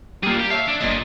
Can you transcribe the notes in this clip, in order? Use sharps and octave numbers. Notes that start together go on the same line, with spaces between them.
G3 A#3 F4 G#4
G4
C#5 E5 F5 A5
D4
G1 A#2 D5 D#5